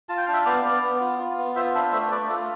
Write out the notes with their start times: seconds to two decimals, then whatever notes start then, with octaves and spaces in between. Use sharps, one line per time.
0.09 F4 A5
0.17 G5
0.25 D4 F5
0.33 E5 G5
0.45 B3 D5 F5
0.65 B3
0.83 B3
1.00 F4
1.19 F4
1.38 B3
1.56 F4 C5 E5
1.74 D4 C5 E5
1.93 A3 C5 E5
2.11 A3 B4 D5
2.29 F4 A4